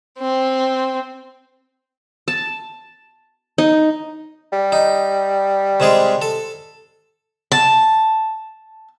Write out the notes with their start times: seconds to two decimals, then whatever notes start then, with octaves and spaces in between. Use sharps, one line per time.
0.19 C4
2.28 A5
3.58 D#4
4.52 G3
4.72 D#4
5.80 C3 G#3 G#4
6.22 A4
7.52 A5